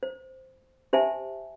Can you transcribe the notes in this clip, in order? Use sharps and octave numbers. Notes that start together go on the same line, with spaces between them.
C5
G4 C5 E5 G#5 A5